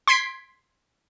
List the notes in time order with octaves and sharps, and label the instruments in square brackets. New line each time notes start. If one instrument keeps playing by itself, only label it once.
[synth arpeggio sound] C6 G#6 B6 C7 D7